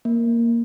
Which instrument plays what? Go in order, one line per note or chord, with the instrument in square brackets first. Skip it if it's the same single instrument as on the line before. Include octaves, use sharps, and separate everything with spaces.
[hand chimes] A#3